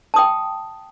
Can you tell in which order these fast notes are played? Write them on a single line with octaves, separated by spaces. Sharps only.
A5 D#6 G5